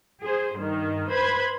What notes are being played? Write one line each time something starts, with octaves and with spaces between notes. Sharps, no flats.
G#4 C5
G2 D#3
B4 C5 B5 G#6